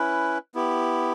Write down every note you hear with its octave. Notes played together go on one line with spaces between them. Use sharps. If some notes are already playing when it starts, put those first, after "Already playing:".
Already playing: C#4 E4 B4
B3 E4 G4